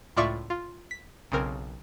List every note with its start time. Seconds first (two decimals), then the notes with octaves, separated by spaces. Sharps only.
0.16 C#2 A2 F4 D5 E5 C#6
0.50 F4
0.91 B6
1.32 B1 C#3 C4 A#4